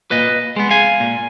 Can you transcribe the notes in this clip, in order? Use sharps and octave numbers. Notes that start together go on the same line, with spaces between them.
A#2 B4 D#5
G#3 B3
F5 G#5
A#2